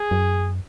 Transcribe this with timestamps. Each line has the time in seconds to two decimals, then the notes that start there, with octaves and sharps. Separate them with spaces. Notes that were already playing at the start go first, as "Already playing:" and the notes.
Already playing: G#4
0.11 F#2